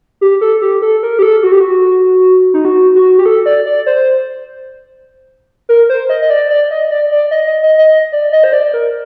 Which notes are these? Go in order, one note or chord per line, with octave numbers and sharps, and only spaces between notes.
G4
A4
G4
A4
A#4
G4
A4
F#4
G4
F#4
D#4
F#4
F#4
G4
A4
D5
D5
C5
A#4
C5
D#5
D#5
D5
D5
D#5
D5
D5
D#5
D#5
D#5
D#5
D5
D#5
C5
D5
A#4